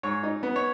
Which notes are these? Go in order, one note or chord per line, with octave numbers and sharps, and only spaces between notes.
G#2 C#5
D#4
B3
C#5